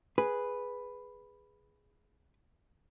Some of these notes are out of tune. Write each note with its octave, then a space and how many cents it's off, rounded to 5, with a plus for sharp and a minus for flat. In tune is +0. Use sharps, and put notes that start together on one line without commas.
G#4 +0 B4 +0